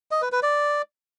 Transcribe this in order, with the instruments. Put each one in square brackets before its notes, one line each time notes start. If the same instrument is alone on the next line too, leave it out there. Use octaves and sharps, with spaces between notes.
[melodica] D#5
B4
B4
D5